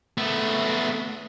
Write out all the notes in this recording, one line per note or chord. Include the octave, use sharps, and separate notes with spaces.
A3 B3